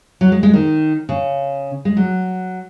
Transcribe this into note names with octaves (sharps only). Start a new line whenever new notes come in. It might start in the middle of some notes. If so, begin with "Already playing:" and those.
F#3
G#3
G#3
D#3
C#3
G#3
F#3